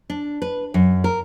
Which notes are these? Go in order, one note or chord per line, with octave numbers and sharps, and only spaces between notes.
D4
B4
F#2
A#4